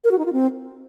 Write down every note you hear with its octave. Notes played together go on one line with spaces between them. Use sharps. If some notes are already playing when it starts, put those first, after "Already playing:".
A#4
F#4
D#4
F4
C4